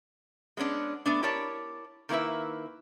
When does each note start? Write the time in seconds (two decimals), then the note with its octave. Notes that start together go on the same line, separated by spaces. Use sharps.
0.57 G#3 B3 C#4 D4
1.06 A3 B3 D4
1.23 E4 G4 A#4 C#5 D5 A5
2.09 D#3 A#3 E4 B4 E5